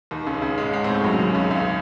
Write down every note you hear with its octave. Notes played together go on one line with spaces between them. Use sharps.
D#2 D#3
C#2 C#3
C#2 C#3
G#2 G#3
G#2 G#3
C4
A2 A3
F#2 F#3
C#3
D#2 D#3
C#2 C#3
C#2 C#3